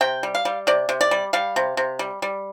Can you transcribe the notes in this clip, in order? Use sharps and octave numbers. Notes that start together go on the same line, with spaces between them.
C3 G5
G3
F5
G3
C3 D5
C3
D5
G3
G3 F5
C3
C3
G3
G3